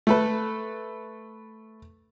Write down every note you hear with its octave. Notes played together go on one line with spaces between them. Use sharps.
A3 A4 B4